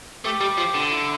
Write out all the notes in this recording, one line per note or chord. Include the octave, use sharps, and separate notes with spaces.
A3 G4
G3
F3
D3
E4